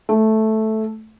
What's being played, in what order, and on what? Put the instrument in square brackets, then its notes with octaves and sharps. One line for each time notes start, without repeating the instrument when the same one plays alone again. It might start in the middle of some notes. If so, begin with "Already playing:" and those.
[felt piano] A3